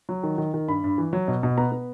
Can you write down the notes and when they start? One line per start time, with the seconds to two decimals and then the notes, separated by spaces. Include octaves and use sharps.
0.09 F#3
0.23 D#3
0.38 D#3
0.54 D#3
0.68 G2 B5
0.84 G2
0.98 E3
1.13 F#3
1.28 B2
1.43 B2
1.58 B3 A#5
1.72 B3